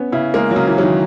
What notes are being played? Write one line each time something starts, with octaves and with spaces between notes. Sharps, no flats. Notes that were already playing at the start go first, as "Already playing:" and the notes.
Already playing: B3 C#4
C#3 E4
G#3 A#3
F#3
C#3
E3
F#3
D#3